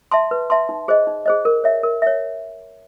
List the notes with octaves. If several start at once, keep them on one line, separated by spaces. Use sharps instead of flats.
E5 A5 C6
B4
E5 A5 C6
D#4
G#4 C5 D#5
D#4
G#4 C5 D#5
A#4
C#5 E5
A#4
C#5 E5